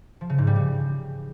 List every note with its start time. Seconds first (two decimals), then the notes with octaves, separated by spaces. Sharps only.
0.21 F3
0.30 C#3
0.38 G#2
0.47 G3
0.56 C#3